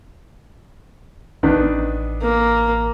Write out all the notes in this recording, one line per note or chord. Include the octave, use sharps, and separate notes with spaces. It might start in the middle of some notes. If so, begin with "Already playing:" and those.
A1 D#3 B3 D4
A#3